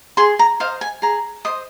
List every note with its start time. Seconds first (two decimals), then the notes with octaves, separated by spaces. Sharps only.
0.17 G#4 C6
0.39 A#5
0.60 C5 D#5 F5
0.81 G#5
1.02 G#4 A#5
1.45 C5 D#5 D#6